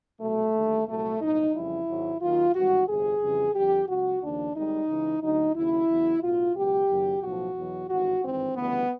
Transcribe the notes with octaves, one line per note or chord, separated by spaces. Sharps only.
C2 B2 F#3 A3
D#2 D3 G3
C2 A#2 F#3 A3
B1 A2 F3 D#4
F2 C#3 E3 G3 E4
G#1 G#2 D#3 F#3
D#2 D#3 F#3 F4
G#1 G2 E3 G3 F#4
G1 F2 C3 G#4
F2 C#3 E3 G3
F2 D3 G3 G4
C#2 C#3 F#3 F#4
D#2 C#3 F3 D4
G#1 G#2 D#3 G3 D#4
C#2 C#3 E3
D2 D3 F#3 D#4
D#2 C#3 F#3 E4
E2 C#3 F#3
B1 A2 F#3 F4
C#2 B2 F#3 G4
F#1 F#2 D#3 F#3
B1 A2 F3 F#4
E2 B2 F#3
G#1 G2 E3 F#4
G#1 G2 E3 C4
D2 C#3 E3 G3 B3